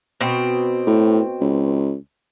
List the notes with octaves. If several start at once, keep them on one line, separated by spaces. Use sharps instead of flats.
B2 C4
A2
C#2